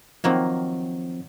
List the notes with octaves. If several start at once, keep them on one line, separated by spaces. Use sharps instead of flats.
D#3 F3 F#3 A#3 C4